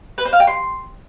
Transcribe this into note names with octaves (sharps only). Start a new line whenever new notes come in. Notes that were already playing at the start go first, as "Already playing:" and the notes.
B4
C5
F5
G5
C6